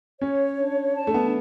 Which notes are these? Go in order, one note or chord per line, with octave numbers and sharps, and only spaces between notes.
C#4 C#5
D4
A5
A3
B3